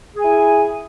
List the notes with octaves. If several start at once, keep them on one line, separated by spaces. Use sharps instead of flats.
E4 G#4 G#5